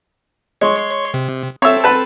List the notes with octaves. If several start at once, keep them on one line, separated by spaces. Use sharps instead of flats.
G#3 C#5 C6 C#6
C3
C4 A4 C#5 E5
B4 A5